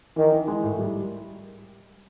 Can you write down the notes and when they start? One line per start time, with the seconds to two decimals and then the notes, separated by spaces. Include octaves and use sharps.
0.16 D#3 E3
0.32 E3
0.48 G#3
0.63 A2
0.79 G3